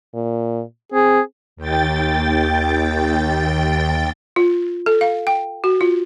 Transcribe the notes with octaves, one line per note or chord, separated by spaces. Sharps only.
A#2
C4 G#4
D#2 G5 A6
F4
A4
F5
G5
F#4
F4